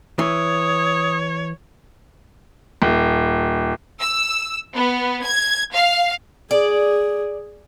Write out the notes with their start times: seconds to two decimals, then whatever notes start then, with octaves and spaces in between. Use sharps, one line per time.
0.19 E3 C#5 D#6
2.82 D#1
4.01 E6
4.75 B3
5.25 G#6
5.74 F5
6.51 G#4 D5